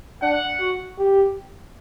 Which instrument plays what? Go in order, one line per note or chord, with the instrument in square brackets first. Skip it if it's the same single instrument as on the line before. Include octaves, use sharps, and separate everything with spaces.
[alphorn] D4 [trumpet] F#5
[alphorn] F#4
G4